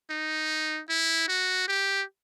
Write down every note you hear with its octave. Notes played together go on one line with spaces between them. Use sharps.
D#4
E4
F#4
G4